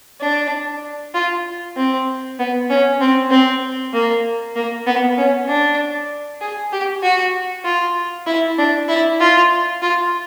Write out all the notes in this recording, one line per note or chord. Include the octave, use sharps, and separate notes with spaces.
D4
F4
C4
B3
C#4
C4
C4
A#3
A#3
B3
C#4
D4
G#4
G4
F#4
F4
E4
D4
E4
F4
F4